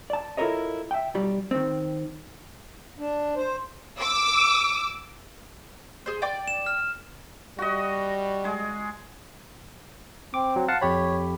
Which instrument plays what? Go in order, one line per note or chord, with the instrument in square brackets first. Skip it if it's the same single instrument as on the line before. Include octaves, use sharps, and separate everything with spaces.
[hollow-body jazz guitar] D5 A5
E4 F4 A4 A#4 C#5 D#5
E5 G5
B1 F#3 G3 G4
D#3 C4
[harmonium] D4
C5
[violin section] D6 E6
[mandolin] G#4 C5
D5 G5 D6
[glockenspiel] E7
F6
[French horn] G3 [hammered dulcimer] F#4 D#5
[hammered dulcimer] G#3 G#4
[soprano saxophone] C4 [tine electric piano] D6
[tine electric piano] F#3
F5 F#5 A5
[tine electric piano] F2 G4 B5 [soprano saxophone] C#5